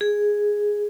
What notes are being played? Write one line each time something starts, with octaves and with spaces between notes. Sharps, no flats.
G#4